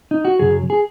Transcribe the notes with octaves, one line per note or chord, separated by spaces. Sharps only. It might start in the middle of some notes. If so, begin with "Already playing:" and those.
D#4
F#4
F#2 C#3 F#3 G#4
G#4